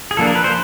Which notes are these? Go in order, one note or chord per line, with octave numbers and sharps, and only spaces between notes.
G#4
F3 A#3 D4 A4
A#4
B4
C5